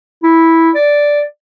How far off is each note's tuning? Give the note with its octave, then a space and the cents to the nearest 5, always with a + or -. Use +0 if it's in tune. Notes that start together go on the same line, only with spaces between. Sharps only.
E4 -10
D5 -5